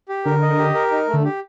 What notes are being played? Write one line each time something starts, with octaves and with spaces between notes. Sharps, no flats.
G4
D3 A#4
D#5
G4
A#4
D#4
A3
D3
G4